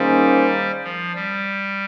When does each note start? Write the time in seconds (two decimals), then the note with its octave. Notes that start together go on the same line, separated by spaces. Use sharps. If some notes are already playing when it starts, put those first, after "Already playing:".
Already playing: D#3 G3 A#3 C#4 G#4 C5
0.84 F3
1.15 G3